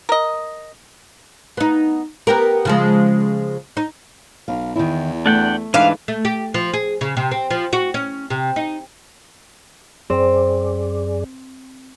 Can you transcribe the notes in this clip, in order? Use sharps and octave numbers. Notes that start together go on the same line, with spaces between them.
A#4 D#5
B3 D#4
B3 G4 A#4
C#3 F3 G#3
D#4
B1 F5
E2 D#3 E4
A3 D4 F#5 G5
G#2 E3 D4 B4 F5
A3
G4
F3
G#4
C#3
C3
C4
F3
F#4
C#4
C3
D#4
F#2 C4 G#4 D5